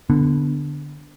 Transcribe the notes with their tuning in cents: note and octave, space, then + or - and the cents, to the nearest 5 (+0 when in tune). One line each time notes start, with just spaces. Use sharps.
D3 +0 B3 +0